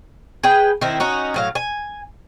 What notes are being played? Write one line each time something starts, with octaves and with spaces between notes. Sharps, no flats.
G#4 B4 G5
D#3 C4 E4
C#4 D#4 F#4
A2 F#3 F5
G#5